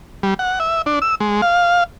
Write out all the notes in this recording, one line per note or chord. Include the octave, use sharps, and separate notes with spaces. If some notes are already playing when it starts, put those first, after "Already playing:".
G3
F#5
E5
D4
E6
G#3
F5